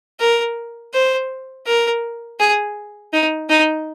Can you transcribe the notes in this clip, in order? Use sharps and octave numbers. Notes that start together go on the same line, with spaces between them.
A#4
C5
A#4
G#4
D#4
D#4